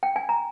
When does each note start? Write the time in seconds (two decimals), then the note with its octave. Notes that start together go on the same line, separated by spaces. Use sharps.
0.03 G5
0.16 G#5
0.29 A#5